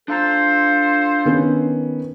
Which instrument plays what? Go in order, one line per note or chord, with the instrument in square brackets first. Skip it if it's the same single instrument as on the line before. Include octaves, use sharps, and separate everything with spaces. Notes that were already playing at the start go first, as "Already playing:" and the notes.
[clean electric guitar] D4 A5 A#5 [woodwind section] F4 A4 C5
[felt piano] D#3 B3 C#4